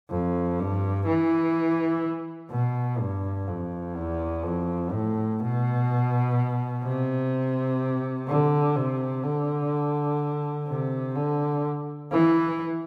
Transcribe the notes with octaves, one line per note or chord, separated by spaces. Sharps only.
F2
G2
E3
B2
G2
F2
E2
F2
A2
B2
C3
D3
C3
D3
C3
D3
E3